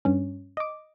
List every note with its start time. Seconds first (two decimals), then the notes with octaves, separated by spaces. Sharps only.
0.05 G2 C#4
0.57 D#5 D6